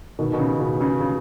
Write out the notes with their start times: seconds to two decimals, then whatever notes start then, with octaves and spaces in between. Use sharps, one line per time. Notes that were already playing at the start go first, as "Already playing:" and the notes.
0.19 B2 D#3
0.33 B2
0.39 C#3
0.60 B2
0.81 C#3
1.01 C#3